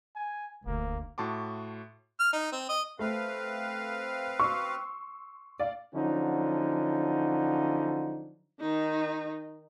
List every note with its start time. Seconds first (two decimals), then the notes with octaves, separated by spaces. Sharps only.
0.15 G#5
0.66 E1 D2 A#3
1.18 A2 F#4 A5 C6 D6
2.20 F6
2.33 D#4
2.52 C4
2.69 D#5
2.99 A3 C4 B4 F5
4.40 C6 C#6 E6
5.60 D5 F5
5.94 D3 F3 F#3 C#4 D#4
8.60 D#3 D#4